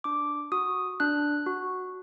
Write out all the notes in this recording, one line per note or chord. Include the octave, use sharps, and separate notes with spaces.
D4 D6
F#4 D#6
D4 F#6
F#4